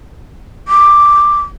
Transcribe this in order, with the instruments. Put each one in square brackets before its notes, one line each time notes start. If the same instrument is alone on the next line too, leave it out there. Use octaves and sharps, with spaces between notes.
[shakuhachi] D6